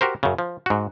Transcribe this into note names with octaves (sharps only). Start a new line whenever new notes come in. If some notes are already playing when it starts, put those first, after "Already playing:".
F#4 G4 A#4 C5
F#2 C#3
F3
G#2 F#4